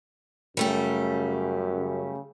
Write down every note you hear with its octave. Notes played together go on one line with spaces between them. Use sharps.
F#2 C#3 G3 A3 G4
C#3